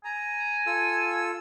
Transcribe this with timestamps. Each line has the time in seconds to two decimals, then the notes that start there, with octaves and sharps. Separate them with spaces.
0.05 G#5 A#5
0.67 F4 A4 E6